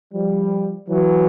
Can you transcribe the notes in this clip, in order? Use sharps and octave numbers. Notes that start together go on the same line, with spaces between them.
F3 G3
E3 F#3